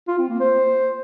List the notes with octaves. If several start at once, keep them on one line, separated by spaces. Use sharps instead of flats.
F4
C4
A#3
C5